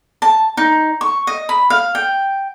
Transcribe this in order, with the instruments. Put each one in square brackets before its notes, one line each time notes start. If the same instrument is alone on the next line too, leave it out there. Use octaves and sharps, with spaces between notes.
[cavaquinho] A5
D#4
C#6
D#5
B5
F5
G5